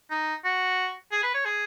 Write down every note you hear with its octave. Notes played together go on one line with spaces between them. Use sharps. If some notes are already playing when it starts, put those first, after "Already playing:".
D#4
F#4
G#4
B4
C#5
G#4